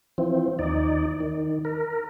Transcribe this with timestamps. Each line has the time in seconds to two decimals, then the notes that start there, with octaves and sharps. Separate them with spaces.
0.18 E3 F3 C4
0.59 D#2 D#4 D5
1.20 D#3
1.65 A#4